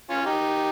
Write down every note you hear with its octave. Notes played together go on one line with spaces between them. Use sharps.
C#4 F4
F4
D#4 G4